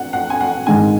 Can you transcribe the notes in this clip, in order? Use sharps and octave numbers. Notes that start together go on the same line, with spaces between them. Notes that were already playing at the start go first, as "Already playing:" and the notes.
Already playing: F#5
F#5
G#5
F#5
G#2 D#3 G#3 G#5